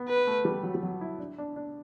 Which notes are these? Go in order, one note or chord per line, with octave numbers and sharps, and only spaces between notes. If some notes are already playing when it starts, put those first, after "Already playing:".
Already playing: B3
B4
A3
G3
F#3
G3
F#3
E4
D4
D4
D4